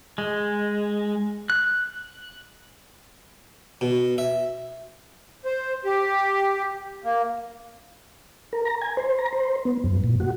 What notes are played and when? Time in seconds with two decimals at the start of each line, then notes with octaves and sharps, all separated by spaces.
0.18 G#3
1.50 F#6
3.81 B2
4.18 E5
5.45 C5
5.85 G4
7.04 A#3
8.53 A#4
8.65 A#5
8.82 G#5
8.97 C5
9.19 A#5
9.33 C5
9.65 B3
9.84 F#2
10.04 A#2
10.20 F#4